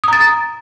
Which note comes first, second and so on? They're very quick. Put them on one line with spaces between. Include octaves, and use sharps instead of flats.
D#6 A#5 A6